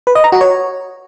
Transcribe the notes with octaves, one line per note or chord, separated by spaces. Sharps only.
B4
D#5
A#5
F#4
C#5